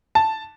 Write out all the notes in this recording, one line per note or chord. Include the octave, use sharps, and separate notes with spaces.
A5